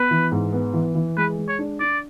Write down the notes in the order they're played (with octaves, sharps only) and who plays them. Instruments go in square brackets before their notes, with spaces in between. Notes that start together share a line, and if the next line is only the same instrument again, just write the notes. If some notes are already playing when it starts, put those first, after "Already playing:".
Already playing: [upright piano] B3 [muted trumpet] B4
[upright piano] E3
G#2
B3
E3
E3
[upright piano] G#3 [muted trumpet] B4
[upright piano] G#3
[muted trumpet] C#5
[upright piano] D4
[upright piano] D4 [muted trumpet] D5